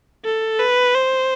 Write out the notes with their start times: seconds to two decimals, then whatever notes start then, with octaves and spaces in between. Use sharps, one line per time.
0.24 A4
0.59 B4
0.94 C5